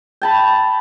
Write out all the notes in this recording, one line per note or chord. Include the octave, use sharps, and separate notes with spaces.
G5 A5 B5